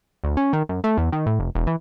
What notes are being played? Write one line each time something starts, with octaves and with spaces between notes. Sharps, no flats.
D2
C#4
D#3
F#2
A3
E2
D#3
A2
F1
E1
E3